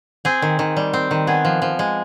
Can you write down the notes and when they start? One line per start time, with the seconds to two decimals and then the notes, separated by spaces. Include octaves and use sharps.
0.25 C4 G#4
0.42 D#3
0.59 D#3
0.76 G3
0.93 C4
1.11 D#3
1.27 B3 G#4
1.45 F3
1.62 F3
1.79 G#3